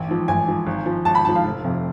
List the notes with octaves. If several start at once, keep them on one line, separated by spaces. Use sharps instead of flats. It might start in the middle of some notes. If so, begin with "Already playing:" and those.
Already playing: A1
G#2 F3
A1 G#5
G#2 F3
G#1
G#2 F3
G#1 A5
B5
G#2 F3 A5
F5
F1
F2 C3